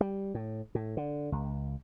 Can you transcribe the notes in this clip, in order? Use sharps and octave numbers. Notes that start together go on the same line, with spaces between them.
G3
A2
A2
D3
C#2